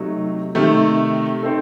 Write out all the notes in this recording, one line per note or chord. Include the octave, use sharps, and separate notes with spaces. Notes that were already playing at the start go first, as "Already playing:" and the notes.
Already playing: C3 F#3 A3 D#4
C3 D#3 A3
C4 D#4 A4